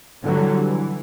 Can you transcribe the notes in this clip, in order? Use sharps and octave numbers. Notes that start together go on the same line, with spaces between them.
D3 E3 F#3 G3
E3